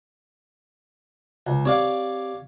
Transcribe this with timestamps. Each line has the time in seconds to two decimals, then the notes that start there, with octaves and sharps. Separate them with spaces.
1.47 C#2
1.65 C4 G4 C#5 D5 F5